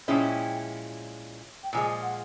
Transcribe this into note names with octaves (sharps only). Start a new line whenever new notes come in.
A#2 F3 G#3 C#4 E4 G5
G5
A#2 F3 G#3 G#5
F#5